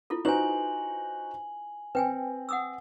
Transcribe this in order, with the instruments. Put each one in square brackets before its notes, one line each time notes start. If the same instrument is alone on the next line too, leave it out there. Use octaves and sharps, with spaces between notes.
[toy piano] E4 F4 A4
[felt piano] D#4 F#4 C5 [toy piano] B4 [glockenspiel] G#5 F#7
[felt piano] C4 [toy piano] B4 G5 G#5
[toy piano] F#5 D#6 E6